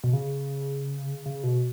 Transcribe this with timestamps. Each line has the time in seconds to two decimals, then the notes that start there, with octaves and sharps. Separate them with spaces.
0.04 B2
0.13 C#3
1.26 C#3
1.43 B2